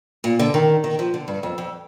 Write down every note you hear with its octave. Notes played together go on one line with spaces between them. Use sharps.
A#2
D3
D#3
D#3
F3
D3
G2
F2
F2